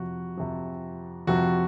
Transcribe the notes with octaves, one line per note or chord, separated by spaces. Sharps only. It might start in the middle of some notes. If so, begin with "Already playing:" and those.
Already playing: F2 C3 F3 F#4
F2 C3 F3
F2 C3 F3 F#4